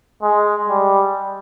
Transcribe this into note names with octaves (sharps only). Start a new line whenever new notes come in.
G#3
G3